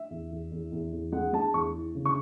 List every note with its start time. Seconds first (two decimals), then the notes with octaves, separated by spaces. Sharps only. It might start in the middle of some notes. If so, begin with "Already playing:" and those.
Already playing: E5
0.10 E2
0.31 E2
0.52 E2
0.72 E2
0.92 E2
1.12 G#3 F#5
1.33 G#3 A5
1.53 E2 C#6
1.74 E3
1.95 C#3
2.05 C#6